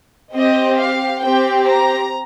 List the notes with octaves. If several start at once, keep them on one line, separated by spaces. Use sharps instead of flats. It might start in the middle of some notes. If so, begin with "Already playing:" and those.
C4 G4 D#5
F5
C4 G4 G5
A#5